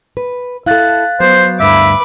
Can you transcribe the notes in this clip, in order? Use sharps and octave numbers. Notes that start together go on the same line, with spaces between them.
B4
E4 A4 F5 F#6 A6
F#3 B3 C5
D2 G2 D4 B4 E5 D6